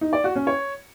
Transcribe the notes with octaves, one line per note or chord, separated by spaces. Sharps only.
D#4
D5
F#4
C#4
C#5